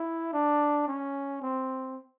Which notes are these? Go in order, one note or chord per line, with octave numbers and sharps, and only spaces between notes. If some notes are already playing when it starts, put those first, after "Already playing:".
Already playing: E4
D4
C#4
C4